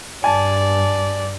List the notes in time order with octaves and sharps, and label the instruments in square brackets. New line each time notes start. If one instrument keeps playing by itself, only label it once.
[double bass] G2 [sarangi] D5 [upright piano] G#5 A5